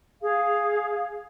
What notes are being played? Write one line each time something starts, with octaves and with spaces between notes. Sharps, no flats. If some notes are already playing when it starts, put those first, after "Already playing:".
G#4 F5